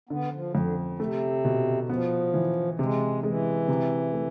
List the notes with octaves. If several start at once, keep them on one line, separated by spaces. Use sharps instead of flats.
D3 B3
F3
F2 D3
C3 A3
B2
F3 B3
E3
C3 G#3
E3 G#3
C3
A3